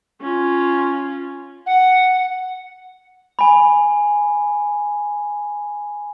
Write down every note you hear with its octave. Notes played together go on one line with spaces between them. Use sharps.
C#4 F4
F#5
G#5 B5